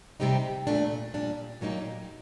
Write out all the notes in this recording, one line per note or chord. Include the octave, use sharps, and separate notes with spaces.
C3 G3 C4 D#4 G4
A#2 A3 D4
A#2 G3 D4
A#2 F#3 A#3 D#4 G4